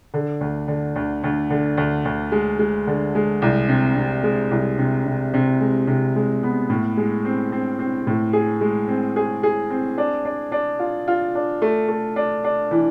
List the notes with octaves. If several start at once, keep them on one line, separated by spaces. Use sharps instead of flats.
D3
D2
D3
D2
D2
D3
D2
D2
G#3
G#3
D3
G#3
C2
C3
C3
G#3
C2
C3
C3
C3
G#3
C3
G#3
B3
A2
G#3
C4
C4
C4
A2
G#4
G#3
C4
G#4
G#4
C4
D4
D4
D4
F4
F4
D4
A3
A3
D4
D4
E3